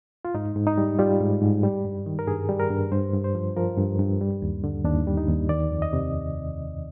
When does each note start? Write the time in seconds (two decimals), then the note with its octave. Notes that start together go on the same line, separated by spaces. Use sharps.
0.25 F4
0.35 G#2 D#4
0.56 G#2
0.67 D#4
0.78 G3
0.99 G3 F4
1.20 G#2
1.42 G#2
1.63 G3
1.85 G2
2.06 D#3
2.19 A#4
2.28 G2 G#4
2.49 G3
2.60 A#4
2.70 G2
2.92 G2 C5
3.13 G2
3.24 C5
3.35 F3
3.56 F3 A#4
3.78 G2
3.99 G2
4.21 G3
4.42 D#2
4.64 D3
4.85 D#2 D4
5.07 G3
5.17 D#4
5.27 D#2
5.49 D#3 D5
5.71 F2
5.82 D#5
5.93 C3